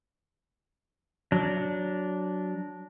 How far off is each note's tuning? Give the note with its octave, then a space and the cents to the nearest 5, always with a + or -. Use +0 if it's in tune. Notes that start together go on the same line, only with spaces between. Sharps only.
F#3 +0 D4 -10